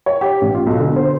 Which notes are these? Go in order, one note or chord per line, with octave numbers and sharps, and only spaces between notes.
C#5
G4
A1
F4
B1
D3
C5